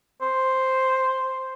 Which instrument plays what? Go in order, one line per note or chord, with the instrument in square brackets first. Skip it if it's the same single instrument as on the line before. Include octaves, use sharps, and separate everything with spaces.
[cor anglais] C5